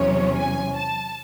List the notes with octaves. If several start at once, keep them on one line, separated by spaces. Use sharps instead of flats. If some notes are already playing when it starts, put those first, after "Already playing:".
Already playing: E2 C3 F#3 C#4 C#5
G#5
A5